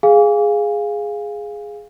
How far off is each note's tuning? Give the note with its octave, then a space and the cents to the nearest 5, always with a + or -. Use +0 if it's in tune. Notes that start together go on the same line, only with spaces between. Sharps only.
G#4 +0 F5 +0 G#5 -25